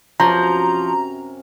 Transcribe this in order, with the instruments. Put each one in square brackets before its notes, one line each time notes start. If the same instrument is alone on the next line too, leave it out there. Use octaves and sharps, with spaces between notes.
[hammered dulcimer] F#2 C3 C#4 [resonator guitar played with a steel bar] F3 [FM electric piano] A#5